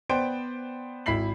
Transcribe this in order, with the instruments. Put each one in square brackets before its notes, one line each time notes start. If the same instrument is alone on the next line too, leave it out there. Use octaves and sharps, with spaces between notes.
[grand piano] B3 C5 D5 G5 C6 D7
G#1 E4 B5 B6 C7 F#7